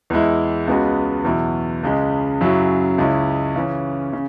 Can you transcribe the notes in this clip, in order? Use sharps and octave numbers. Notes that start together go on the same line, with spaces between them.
E2 E3 G#3 E4
C#2 C#3 G#3 B3 F#4
E2 B2 F#3 E4
C#2 C#3 G#3
F#2 C#3 F#3 E4
C#2 C#3 G#3 C#4 E4
C#3 E3 C#4
C#3